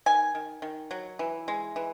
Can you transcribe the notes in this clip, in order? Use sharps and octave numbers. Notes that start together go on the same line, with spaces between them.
D#3 G#5
D#3
D#3
F#3
E3
G#3
E3